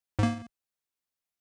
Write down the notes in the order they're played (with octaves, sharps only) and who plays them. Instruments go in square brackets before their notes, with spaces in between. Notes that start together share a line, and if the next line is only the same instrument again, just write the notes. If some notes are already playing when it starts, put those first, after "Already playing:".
[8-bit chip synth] G#2 A#3